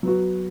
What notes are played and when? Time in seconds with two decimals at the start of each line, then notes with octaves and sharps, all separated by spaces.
0.03 F#3 B3 F#4